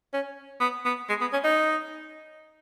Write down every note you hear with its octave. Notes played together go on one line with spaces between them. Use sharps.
C#4
B3
B3
G#3
B3
C#4
D#4